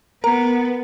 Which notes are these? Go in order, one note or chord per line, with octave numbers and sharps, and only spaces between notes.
B3 A#4 A#5